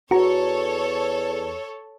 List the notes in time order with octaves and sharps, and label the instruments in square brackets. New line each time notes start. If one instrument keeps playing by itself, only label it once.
[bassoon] E2 [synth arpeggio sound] F#4 A#5 [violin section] A4 C#5